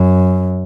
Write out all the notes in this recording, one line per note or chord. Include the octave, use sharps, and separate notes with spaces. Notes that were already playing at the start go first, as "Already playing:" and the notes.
Already playing: F#2